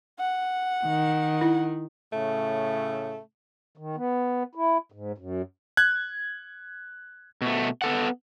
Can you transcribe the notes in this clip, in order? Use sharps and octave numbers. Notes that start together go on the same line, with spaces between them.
F#5
D#3
E4
A2 C#3 A3
D#3
B3
E4
G#2
F#2
F#6 G#6
B2 A3
B3 A4 F#5